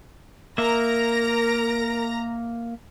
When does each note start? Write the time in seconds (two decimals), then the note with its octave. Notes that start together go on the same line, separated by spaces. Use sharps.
0.58 A#3 A#4 E5 A#5 A#6